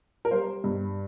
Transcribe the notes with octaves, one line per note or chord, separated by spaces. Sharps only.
A#4
G3 C5
G2